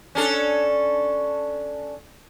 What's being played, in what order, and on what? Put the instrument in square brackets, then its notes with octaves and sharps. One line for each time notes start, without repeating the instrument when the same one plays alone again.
[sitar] C#4 D4 A4